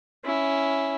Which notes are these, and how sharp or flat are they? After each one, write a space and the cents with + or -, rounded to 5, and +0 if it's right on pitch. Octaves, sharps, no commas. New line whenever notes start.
C#4 +0 E4 -5